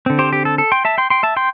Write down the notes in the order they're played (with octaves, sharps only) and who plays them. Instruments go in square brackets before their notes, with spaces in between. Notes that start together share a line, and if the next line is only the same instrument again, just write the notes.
[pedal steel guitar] D3 C4
G4 C5
G4
A4
A4
G5 C6
E5 A5
G5 C6
G5 C6
E5 A5
G5 C6